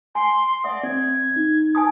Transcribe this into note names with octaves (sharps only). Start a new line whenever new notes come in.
G#5 C6
D5 E5 F#5 D#6
C4 D5 G#6
D#4
G#5 A5 D#6